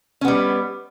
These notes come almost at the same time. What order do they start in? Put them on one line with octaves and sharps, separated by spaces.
C#4 B3 G3